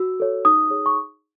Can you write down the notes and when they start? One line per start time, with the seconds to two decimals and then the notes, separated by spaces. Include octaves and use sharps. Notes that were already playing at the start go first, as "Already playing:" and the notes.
Already playing: F#4 E6
0.20 A4 C#5
0.45 D#4 D#6
0.70 G#4 C#5
0.86 C#6